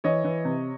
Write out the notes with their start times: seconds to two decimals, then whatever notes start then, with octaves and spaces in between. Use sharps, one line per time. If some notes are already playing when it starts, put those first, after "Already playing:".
0.04 E3 C#5 D#5
0.24 E3
0.45 C3